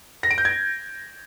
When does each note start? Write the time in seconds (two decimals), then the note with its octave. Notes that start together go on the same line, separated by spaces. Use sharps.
0.23 A#6
0.31 D7
0.38 G6
0.45 G#6